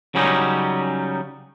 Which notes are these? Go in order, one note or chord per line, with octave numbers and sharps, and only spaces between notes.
C#3 F#3 G3 C#4 D#4